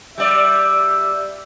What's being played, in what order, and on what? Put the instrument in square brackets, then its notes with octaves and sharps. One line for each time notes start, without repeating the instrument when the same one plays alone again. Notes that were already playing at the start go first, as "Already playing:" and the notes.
[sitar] G3 D5 [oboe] E5